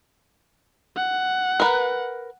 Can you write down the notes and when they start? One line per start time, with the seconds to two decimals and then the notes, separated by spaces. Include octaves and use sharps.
0.96 F#5
1.60 A#4 B4